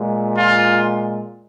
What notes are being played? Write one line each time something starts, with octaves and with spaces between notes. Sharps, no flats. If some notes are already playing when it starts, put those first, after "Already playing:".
Already playing: A#2 G#3
F4